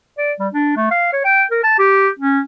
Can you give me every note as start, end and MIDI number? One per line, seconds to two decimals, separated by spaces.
0.18 0.33 74
0.40 0.48 55
0.53 0.77 62
0.77 0.90 57
0.91 1.12 77
1.13 1.23 73
1.25 1.43 79
1.51 1.61 70
1.64 1.76 81
1.79 2.09 67
2.19 2.40 61